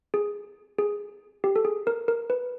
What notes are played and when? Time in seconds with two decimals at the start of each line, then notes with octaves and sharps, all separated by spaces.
0.14 G#4
0.78 G#4
1.44 G4
1.56 A4
1.65 G#4
1.87 A#4
2.08 A#4
2.30 B4